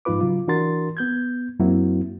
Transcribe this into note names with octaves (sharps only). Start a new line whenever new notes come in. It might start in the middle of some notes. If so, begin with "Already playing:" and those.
G#2 F3 D#4 F4 B4 D6
C#3 F#3 F4
E3 D4 F#4 A#4 C6 A6
B3 G6 G#6
F#2 F#3 A#3 C4 E4 F#4